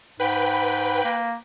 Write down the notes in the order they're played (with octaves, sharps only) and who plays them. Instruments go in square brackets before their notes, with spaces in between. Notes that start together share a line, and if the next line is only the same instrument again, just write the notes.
[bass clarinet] G#2 [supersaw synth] B4 G5 B5
[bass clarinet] A#3